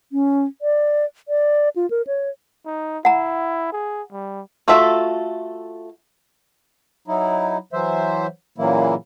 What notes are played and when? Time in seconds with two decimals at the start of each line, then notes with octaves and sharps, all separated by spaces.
0.12 C#4
0.62 D5
1.28 D5
1.76 F4
1.90 A#4
2.07 C#5
2.65 D#4
3.05 E4 F#5 A#5
3.72 G#4
4.12 G3
4.68 A3 F4 F#4 A4 E5
7.08 F#3 D#4 E4
7.73 E3 F#3 C5 E5
8.58 A#2 C#3 E3 F#3 A#3 E4